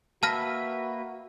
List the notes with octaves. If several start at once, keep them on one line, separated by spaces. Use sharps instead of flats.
A#3 F#4 B4 E5 A5 F6 A#6